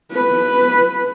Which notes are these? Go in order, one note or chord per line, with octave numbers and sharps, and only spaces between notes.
B4